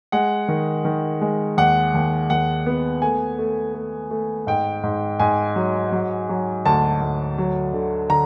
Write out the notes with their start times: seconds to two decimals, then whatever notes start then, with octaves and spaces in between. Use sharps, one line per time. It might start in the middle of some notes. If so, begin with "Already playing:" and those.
0.12 G#3 F#5
0.48 D#3
0.85 D#3
1.21 G#3
1.57 D#2 F#5
1.94 D#2
2.30 D#2 F#5
2.66 B3
3.02 A3 G#5
3.39 A3
3.74 A3
4.11 A3
4.47 G#2 G5
4.83 G#2
5.20 G#2 G#5
5.56 F#3
5.92 F#3
6.29 F#3
6.66 D2 A5
7.01 D2
7.38 F#3
7.74 D3
8.10 D3 A#5